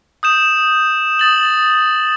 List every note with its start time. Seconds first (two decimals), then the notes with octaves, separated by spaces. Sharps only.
0.23 D#6 G6 E7
1.19 D#6 A6 F#7